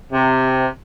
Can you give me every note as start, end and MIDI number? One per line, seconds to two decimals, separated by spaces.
0.12 0.66 48